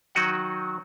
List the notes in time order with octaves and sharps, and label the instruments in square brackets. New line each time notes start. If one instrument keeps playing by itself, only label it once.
[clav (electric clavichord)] D#3 F#3 D#4 F#4 D#5 F#5